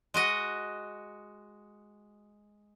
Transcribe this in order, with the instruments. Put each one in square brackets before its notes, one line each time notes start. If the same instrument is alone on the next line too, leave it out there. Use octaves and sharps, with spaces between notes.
[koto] G#3 F#4 D#5 F#5